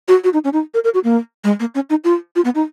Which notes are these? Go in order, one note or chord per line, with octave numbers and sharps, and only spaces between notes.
F#4
F#4
D#4
C#4
D#4
A#4
A#4
F#4
A#3
G#3
A#3
C#4
D#4
F4
F4
B3
D#4